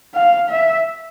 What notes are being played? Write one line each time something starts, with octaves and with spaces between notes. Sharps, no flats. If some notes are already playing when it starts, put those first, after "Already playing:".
F5
E5